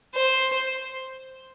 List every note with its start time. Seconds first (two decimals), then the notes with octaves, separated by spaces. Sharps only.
0.15 C5